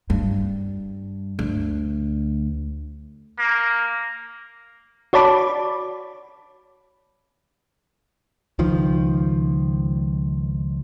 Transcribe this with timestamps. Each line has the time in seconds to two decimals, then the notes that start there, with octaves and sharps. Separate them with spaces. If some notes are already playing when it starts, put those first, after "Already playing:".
0.10 G2
1.39 D2
3.39 A#3
5.13 F#4 C#5 D5 A5 B5 D6
8.59 C#2 D#3 F3